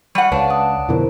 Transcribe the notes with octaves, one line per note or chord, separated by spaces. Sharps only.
G3 F#5 C#6
C#2 D4 B4 C#5 F5
F#5 A5 D#6
F2 B2 D3 E4 A#4 C5